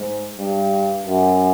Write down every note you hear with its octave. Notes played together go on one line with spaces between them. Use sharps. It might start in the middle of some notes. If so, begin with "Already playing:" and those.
Already playing: G#2
G2
F#2